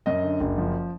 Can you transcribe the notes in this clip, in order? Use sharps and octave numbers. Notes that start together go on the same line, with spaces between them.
F#2 D#5
D3
F#1
F3